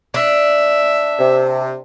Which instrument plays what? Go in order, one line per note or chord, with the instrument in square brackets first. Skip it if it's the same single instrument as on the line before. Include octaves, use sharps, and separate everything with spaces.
[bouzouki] D4 [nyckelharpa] E5
[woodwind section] C3